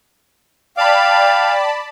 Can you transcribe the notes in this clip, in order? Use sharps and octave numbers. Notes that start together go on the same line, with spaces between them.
D5 F5 G5 A5 B5